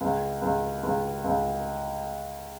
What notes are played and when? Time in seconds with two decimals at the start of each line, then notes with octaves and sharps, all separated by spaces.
0.01 C#2
0.42 C#2
0.83 C#2
1.24 C#2